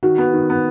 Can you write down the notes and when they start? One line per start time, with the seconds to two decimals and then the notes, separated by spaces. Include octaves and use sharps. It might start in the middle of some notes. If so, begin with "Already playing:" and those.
0.03 D#3 F#4
0.18 B3
0.33 D#3
0.50 B3